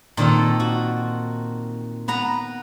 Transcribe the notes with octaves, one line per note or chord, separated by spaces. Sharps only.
A#2 D#3 C4 A4
F#4
B3 B4 A#5